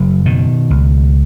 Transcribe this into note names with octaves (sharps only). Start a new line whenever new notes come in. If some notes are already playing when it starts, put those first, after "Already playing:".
Already playing: F#1 F#3
B2 D#3
C#2